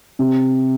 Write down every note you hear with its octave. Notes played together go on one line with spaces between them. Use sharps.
C3